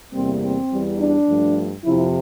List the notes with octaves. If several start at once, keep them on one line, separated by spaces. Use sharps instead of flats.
E2 C3 G3 A#3 C4
C4
E2 E3 G3
D4
G2 F3 A3
F2 C3 F3 E4